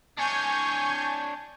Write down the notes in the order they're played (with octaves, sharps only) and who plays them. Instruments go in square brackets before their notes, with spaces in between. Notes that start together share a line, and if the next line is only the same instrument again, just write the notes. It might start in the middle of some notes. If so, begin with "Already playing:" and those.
[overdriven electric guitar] D4 C#5 [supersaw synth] G#5 C#6 G6